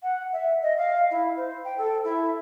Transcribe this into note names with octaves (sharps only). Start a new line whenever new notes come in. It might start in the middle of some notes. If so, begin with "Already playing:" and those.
F#5
E5
D#5
F5
E4
C5
G5
A4
E4